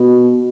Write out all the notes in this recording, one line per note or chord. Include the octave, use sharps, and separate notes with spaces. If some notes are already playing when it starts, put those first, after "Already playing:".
Already playing: B2